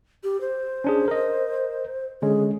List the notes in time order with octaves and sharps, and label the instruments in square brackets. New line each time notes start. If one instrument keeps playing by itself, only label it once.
[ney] G4
C5
[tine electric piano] C#4 D4 G#4
A#4 D#5
[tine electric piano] D3 G#3 C#4 [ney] G#4